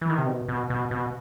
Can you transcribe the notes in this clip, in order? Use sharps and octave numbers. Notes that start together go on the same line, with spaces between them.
E3
D#3
C3
B2
B2
B2
B2